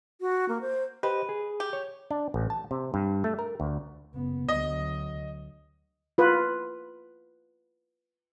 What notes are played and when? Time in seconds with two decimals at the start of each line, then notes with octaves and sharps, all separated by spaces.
0.21 F#4
0.49 A#3
0.61 C5
1.03 G4 B4 C5 D#5
1.29 G#4
1.60 G4
1.73 C#5
2.11 D4
2.34 A1
2.50 A5
2.71 C3
2.94 G2
3.24 A3
3.39 A#4
3.60 D2
4.14 F#1 B3
4.49 D2 F#3 D#5
6.18 F4 B4